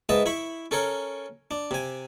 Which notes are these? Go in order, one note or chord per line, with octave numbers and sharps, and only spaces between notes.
G#2 B4 D#5 E5 A5
E4 B5 C#6
C#4 A4 A#4 C#5
D4
C3 G#5